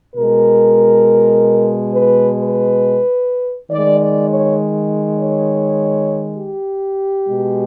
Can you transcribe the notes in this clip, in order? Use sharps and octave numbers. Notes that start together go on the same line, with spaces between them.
B2 G#3 A#4
B4
B4
D#3 G#3 D5
D5
C#5
C#5
G4
B2 G#3